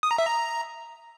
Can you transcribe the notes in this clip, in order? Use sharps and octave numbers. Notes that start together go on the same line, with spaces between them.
D#6
A#5
E5
A#5